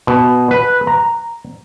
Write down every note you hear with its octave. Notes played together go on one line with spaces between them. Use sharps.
B2
B4
A#5